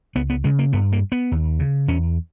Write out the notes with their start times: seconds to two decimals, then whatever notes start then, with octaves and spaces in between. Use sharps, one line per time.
0.15 C#2 B3
0.30 B3
0.44 C#3 G#3
0.59 A#3
0.73 G2 B3
0.92 A#3
1.12 B3
1.32 D#2
1.60 C#3
1.88 E2 C#4